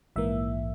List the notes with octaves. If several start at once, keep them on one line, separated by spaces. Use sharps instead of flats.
A#1 G#2 E3 A#3 E5